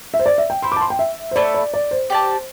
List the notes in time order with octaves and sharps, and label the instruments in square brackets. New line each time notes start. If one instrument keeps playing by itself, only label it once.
[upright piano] E5
C5
D5
E5
G5
[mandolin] C4 E4 C5 [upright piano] C6
[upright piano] A5 D6
C6
G5
E5
C5
[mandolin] A3 E4 A4 [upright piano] D5
[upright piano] D5
D5
C5
[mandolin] G4 D5 A5